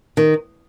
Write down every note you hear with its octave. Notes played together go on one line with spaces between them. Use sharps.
D#3